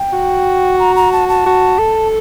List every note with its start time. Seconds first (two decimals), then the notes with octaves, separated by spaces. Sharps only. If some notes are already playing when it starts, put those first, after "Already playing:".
Already playing: G5
0.12 F#4
0.79 A#5
0.96 A#5
1.12 A5
1.29 A5
1.46 F#4
1.79 A4